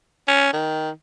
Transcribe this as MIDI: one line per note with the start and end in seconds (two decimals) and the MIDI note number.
0.28 0.52 61
0.53 0.91 51